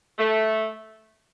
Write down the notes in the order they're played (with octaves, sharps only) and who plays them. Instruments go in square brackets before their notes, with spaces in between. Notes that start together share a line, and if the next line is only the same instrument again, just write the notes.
[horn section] A3